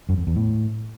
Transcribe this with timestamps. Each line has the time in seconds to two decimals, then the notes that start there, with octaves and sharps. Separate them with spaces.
0.09 F#2
0.18 F2
0.27 E2
0.36 A2